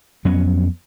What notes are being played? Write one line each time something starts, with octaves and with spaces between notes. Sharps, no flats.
F2 F#3 B3 C#4